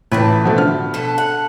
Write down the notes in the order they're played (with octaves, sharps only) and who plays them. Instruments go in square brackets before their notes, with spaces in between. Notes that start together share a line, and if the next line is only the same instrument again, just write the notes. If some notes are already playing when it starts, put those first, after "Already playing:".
[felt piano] A1 E3 [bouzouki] A2 G4 B4
[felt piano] B2 F3 A3
D3 F6
[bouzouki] B2 B3 A4
F#5